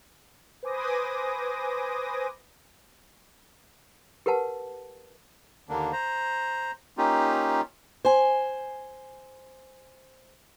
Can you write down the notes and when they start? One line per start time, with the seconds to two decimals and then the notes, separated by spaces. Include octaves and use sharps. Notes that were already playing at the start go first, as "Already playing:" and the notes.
0.63 B4 C5 G#5 D6 D#6 A#6
4.26 G4 A#4 B4 F#5 A5
5.69 D#2 D3 A#3 D4
5.93 C5 A#5
6.98 A#3 C#4 D#4 F4 G4
8.05 C5 G#5